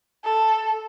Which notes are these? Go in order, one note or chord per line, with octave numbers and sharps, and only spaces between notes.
A4